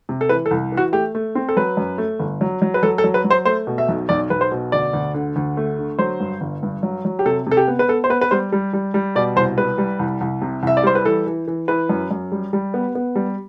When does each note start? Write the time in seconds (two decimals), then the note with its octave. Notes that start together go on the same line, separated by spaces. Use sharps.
0.09 C3
0.21 A4
0.29 E3 B4
0.46 A4
0.51 C2
0.72 E3
0.77 F#4
0.92 A3 G4
1.15 A3
1.35 C4
1.49 A4
1.56 F#3 B4
1.77 F#2
1.98 A3
2.20 G1
2.41 F#3
2.62 F#3
2.74 B4
2.83 F#3 A4
2.98 A4
3.04 F#3
3.14 B4
3.24 F#3
3.30 C5
3.45 A3 C5
3.67 B2
3.78 E5
3.88 B1
4.09 B1 D5
4.30 B1 B4
4.41 C5
4.52 B2
4.72 D2 D5
4.93 D2
5.14 D3
5.36 D2
5.57 A3
5.79 D3
5.99 F#3 C5
6.20 G2
6.41 G1
6.63 G2
6.83 F#3
7.05 F#3
7.19 G4
7.26 C3 A4
7.47 C3 A4
7.57 G4
7.68 B3
7.79 B4
7.88 B3 A4
8.04 C5
8.10 B3 B4
8.21 B4
8.31 G3 C5
8.52 G3
8.73 G3
8.94 G3
9.16 B2 D5
9.36 C2 C5
9.57 G3 B4
9.78 G3
9.99 C2
10.21 C2
10.42 C3
10.63 C2 E5
10.77 D5
10.83 G3 C5
10.95 B4
11.05 E3 A4
11.26 E3
11.47 E3
11.68 E3 B4
11.89 F#2
12.11 F#2
12.32 G3
12.53 G3
12.74 B3
12.95 B3
13.15 G3